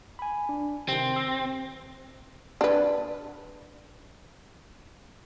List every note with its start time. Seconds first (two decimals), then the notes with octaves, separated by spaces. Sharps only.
0.19 G#5 B5
0.49 D4
0.89 C3 D#3 C4
1.16 E6 A#6
2.61 D4 B4